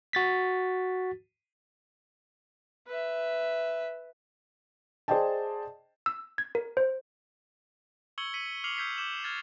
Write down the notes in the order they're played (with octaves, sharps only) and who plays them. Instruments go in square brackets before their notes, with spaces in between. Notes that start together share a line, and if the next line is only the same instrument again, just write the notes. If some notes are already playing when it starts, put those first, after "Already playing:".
[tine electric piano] F#4 A6 B6
[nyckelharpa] B4 E5
[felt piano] G#4 C5 D5 D#5 G5 A5
[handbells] E6
G#6
A#4
C5
[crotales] C#6 E6 G#6 C#7 F#7 G7
E6 B6 C#7 D#7 F#7
D6 F6 C7 C#7 F7 F#7
E6 G6 G#6 B6 C7
D6 G6 E7
F6 G#6 A6